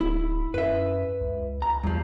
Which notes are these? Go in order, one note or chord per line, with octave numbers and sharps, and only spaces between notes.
D1 E4
F#2 B4 E5
C#2
A#5
E2 G2 F3